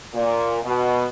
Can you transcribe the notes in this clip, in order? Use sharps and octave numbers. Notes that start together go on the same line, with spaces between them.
A#2
B2